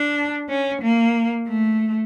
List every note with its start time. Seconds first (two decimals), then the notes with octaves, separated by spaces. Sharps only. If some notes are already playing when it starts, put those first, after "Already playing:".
Already playing: D4
0.49 C#4
0.82 A#3
1.47 A3